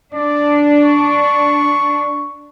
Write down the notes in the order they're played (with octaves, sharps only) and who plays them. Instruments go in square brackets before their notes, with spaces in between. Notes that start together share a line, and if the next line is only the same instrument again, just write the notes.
[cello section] D4 [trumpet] D5
[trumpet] C#6